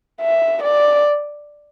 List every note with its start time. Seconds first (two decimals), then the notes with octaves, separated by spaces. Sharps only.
0.21 E5
0.63 D5